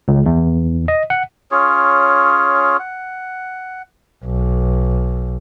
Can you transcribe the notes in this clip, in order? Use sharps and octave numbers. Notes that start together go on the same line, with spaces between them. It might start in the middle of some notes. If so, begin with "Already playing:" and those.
C#2
E2
D#5
F#5
C#4 F4 G#4 C#5
F#5
B1